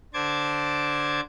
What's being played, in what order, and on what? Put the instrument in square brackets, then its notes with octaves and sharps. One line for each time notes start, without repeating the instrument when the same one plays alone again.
[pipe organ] D3 C5 A5 D6 G#6